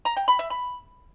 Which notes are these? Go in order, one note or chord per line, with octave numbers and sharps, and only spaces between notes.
A#5
G5
B5
E5
B5